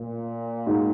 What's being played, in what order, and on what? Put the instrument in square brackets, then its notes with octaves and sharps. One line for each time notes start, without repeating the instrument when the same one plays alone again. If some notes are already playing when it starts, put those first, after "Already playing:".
Already playing: [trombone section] A#2
[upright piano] G#2 G#3 D#4 F#4